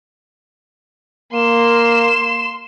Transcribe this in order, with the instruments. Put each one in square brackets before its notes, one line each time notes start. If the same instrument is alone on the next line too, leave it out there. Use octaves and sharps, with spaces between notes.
[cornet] A#3 [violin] C6 E7